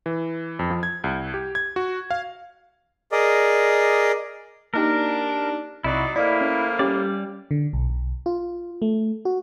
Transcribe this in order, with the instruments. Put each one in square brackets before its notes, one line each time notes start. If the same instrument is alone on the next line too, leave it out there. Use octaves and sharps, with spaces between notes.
[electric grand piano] E3
F2
F3
G#6
C2
G4
G#6
F#4
F5
[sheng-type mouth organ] G#4 A#4 D5 D#5
[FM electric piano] A#3 D#4 G4 [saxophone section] D4 [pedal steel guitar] A#4
[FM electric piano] C2 C3 [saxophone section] F#3 D#4 D5 [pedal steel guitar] E4 F#4
[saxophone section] A2 F3 A#3 [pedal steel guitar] E4 [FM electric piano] D5 D#5
[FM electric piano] C#4
[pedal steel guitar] G3 D5 [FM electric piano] C#4 G4
[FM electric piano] D3
B1
B1
F4
A3
F#4